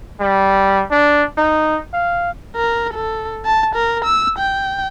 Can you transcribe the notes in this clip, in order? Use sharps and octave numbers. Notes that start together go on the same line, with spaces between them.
G3
D4
D#4
F5
A#4
A4
A5
A#4
E6
G5